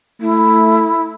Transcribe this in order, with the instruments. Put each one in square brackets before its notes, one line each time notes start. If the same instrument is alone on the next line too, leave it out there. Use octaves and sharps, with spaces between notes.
[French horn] A3 [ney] E4